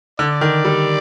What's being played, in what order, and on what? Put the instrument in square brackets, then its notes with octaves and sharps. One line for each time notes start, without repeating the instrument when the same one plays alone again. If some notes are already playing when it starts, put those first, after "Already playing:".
[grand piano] D3 [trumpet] D5
[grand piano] D#3
G3